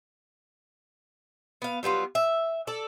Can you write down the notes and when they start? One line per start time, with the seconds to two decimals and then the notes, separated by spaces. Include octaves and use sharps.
1.62 B3 F5
1.83 F#3 G3 B3 F4
2.15 E5
2.67 A4 D5